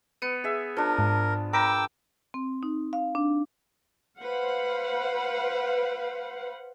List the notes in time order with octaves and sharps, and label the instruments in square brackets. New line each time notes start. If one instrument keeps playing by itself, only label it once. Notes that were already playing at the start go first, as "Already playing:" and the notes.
[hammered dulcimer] B3 [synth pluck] C#7 D#7
[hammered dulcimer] G#4 E5
[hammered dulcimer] F3 D4 [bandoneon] A#4
[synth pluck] G#2
[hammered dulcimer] A#4 [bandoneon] G5 D6 E6 [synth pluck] A#5 B5
[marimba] C4
D#4
F5
D4
[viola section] B4 C5 F5 F#5